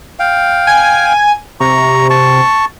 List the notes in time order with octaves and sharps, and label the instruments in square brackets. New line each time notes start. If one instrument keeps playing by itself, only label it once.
[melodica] F5 G5
[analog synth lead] G#5
[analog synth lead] C3 [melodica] A#5 C#6
[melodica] A5 C#6